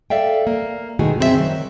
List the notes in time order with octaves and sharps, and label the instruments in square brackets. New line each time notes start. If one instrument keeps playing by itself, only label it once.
[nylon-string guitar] A4 D5 E5 F5 G5
A#3
B2 D#3 G#3 A3 F#4 G#4
F#2 B2 C4 G#4 A4 E5
D#3 F#3